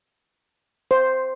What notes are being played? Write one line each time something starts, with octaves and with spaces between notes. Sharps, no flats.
C5